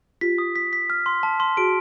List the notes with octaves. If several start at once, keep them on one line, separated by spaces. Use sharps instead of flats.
F4 G4 B6
D#6
B6
B6
F6
C6
A5
C6
F#4 G#4 D7